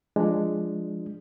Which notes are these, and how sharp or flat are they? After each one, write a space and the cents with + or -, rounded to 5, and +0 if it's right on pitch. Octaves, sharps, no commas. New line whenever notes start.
F3 +0 G#3 +0 D4 +5